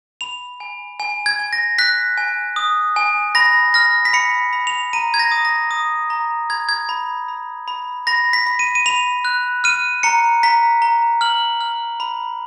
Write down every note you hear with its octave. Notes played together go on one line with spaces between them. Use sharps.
B5 F7
G#5
G#5
G#6
G#5
A#6
F#6 B6
G#5
D#6
G#5
B5 A#6
F6 A#6
B6
B5 C#7
B5
F7
A#5 D#7
G#6
A#6
D#6
A#6
D#6
A#5
B5 G#6
G#6
B5
B5
B5
B5 A#6
B6
B5
D#7
D#7
B5 F7
F#6
F6 D#7
A#5 C#7
A#5 B6
A#5
F6 F#7
F6
B5